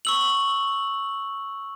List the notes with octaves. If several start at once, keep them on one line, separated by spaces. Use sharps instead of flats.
C#6 E6 F#7